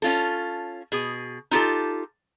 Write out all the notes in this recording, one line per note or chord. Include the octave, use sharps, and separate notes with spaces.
C#4 F4 A4
B2 G#4
D#4 F4 G4 A4